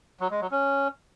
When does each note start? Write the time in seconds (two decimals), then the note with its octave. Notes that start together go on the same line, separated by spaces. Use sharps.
0.20 F#3
0.31 G#3
0.41 F#3
0.51 C#4